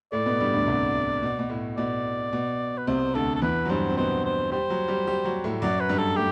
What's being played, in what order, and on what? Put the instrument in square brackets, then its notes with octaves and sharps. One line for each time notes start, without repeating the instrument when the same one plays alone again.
[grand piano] A2 A3 [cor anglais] D5
[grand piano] B2 B3
G2 G3
D2 D3
C2 C3
B2
B2
A2
[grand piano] B2 [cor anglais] D5
[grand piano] B2
[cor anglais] B4
[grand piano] C2 C3 [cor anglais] C5
[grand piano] D2 D3 [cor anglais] A4
[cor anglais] A4
[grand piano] E2 E3 [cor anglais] B4
[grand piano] F#3
[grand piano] G2 G3 [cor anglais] C5
[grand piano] C4
[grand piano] B2 B3 [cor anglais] C5
[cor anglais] C5
[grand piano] G3 G4 [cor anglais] C5
[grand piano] F#3 F#4
G3 G4
G3 G4
F#3 F#4
A2 A3
[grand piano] F#2 F#3 [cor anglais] D5
[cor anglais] B4
[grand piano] G2 G3
[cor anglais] A4
[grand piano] A3 [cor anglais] G4